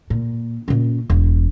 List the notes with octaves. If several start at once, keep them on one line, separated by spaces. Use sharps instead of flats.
A#2
A#2 C#4
E1